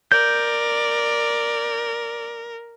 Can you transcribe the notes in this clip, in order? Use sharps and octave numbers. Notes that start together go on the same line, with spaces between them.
A#4 D5 G6